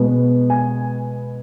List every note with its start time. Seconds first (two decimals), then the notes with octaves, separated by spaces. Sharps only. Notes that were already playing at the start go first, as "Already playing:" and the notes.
Already playing: B2 G#3 B3
0.50 G#5